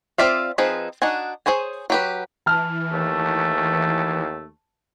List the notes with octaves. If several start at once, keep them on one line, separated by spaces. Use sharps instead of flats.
C4 F4 D5 E5 F5
F3 C4 D#4 G#4 B4
D4 D#4 F#4 F#5 G#5
G#4 C5 C#5 G#5
F#3 G4 B4
E3 A5 F6
D#2 A3